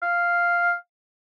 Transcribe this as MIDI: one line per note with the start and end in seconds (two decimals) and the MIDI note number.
0.02 0.73 77